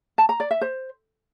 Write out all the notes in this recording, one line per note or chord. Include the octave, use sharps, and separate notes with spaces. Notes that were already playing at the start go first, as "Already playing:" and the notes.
A5
A#5
D5
E5
C5